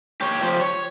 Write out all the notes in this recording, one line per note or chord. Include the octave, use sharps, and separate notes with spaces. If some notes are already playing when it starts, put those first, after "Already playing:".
G4 C#5
F3 G4
C#5